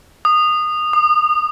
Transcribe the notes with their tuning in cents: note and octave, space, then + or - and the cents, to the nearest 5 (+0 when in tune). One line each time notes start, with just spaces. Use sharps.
D#6 -20
D#6 -40